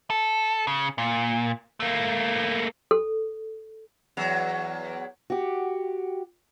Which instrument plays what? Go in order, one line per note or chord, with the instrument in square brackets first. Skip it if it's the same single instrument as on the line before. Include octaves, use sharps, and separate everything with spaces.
[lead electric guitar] A4
C#3
A#2
A3 A#3
[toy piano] A4
[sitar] E2 F#3
[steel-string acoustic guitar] F#4 G4